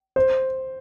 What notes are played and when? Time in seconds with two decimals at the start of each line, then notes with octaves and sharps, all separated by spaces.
0.16 C5